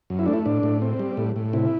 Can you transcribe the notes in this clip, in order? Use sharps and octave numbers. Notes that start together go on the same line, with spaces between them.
F#2
E4
A3 D4
E4
A2 D4
A2
C4
G3
A2
A2
C3 E4